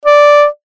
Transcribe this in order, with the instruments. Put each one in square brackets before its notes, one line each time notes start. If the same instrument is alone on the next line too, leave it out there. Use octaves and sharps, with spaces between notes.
[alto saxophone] D5